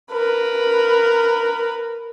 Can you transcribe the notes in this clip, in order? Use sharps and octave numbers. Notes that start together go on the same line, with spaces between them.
A#4 B4